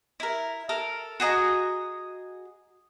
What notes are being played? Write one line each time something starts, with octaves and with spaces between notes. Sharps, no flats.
E4 A#4
A4 A#4 F6
F#4 G#4 D#5 A#5